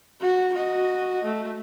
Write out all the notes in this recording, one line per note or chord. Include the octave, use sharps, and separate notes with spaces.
F#4
F#4 D#5
A3